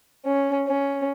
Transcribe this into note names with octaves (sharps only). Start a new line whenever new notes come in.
C#4
C#4